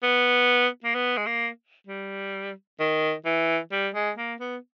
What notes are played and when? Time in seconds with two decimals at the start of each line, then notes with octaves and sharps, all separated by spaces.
0.03 B3
0.84 A#3
0.95 B3
1.17 G#3
1.26 A#3
1.87 G3
2.80 D#3
3.25 E3
3.72 G3
3.94 G#3
4.17 A#3
4.40 B3